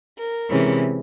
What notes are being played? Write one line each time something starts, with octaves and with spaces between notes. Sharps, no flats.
A#4
C3 E3 G#3 C#4